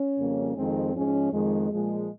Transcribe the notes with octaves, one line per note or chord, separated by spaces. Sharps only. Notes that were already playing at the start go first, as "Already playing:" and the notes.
Already playing: C#4
F2 C#3 G3 A#3
F2 D#3 G#3 C4
G#2 F3 G#3 C#4
F2 D#3 G#3
A#2 F3 G#3